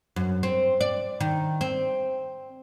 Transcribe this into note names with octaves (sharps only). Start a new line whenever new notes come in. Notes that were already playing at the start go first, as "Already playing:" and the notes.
F#2
C4
D5
D#3
C4